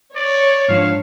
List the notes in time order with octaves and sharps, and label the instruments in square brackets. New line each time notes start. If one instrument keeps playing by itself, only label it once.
[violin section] C#5 [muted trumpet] D5
[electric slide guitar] G#2 F3 D4 [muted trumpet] F5